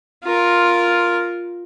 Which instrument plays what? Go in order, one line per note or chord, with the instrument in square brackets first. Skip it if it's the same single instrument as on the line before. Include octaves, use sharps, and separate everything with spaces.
[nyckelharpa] F4 A#4